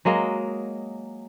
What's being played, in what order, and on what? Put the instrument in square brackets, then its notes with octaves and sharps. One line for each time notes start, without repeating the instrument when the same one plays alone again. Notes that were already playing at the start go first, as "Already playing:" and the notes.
[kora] F#3 G#3 A#3 D#5